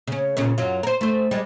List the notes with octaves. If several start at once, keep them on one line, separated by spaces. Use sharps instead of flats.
C#3 C#4
A#2 C#3 C#4
F#2 F#3 F4
A#4 C5
A3 C5
G3 G#3